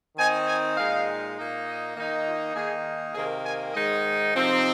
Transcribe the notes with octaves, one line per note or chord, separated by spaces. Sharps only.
D#3 C4 D#4 G#5
G#5
A#2 G#3 D#4 F5
A#2 A#3 D#4
D#5
D#3 A#3 D#4
F4
D#3 A#3 D#4 G#4
C3 D#3 A#3 G#4
G#5
G#2 D#3 G#3 D#4 D#5
C3 F3 C4 D#4